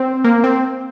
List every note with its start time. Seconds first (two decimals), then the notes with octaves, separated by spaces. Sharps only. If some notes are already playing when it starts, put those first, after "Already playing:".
Already playing: C4
0.24 A#3
0.44 C4